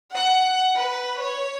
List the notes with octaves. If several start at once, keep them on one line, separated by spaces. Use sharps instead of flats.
F#5
B4
C#5